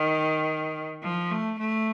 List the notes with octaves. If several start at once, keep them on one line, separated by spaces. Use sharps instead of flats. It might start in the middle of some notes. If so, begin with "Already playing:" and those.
Already playing: D#3
F3
A3
A3